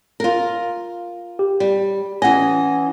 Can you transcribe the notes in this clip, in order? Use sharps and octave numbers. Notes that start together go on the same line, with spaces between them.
F4 A#4
G4
G3
E3 C#4 D#5 F#5 G#5